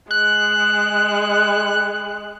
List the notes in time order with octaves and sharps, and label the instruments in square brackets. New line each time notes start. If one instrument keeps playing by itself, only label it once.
[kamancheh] G#3 [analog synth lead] F#6